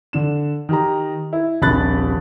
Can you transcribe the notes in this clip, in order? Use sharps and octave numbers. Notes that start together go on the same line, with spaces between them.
D3 D4 E7
D#3 G4 A#5
E4
D#1 A#1 C3 B5 F#6 A6